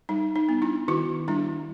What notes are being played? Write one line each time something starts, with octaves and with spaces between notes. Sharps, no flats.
G3 D#4
D#4
B3
D4 E4
D#3 E4 F#4
G3 D4 E4